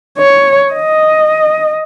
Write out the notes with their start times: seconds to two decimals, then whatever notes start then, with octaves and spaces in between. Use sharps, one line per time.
0.18 C#5
0.73 D#5